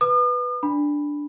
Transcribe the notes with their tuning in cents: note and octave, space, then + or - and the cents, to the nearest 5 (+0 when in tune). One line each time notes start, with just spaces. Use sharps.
B4 +0 D#6 -45
D4 +0 B5 +0